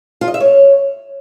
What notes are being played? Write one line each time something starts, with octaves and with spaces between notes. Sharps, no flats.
F4
D#5
E5
C#5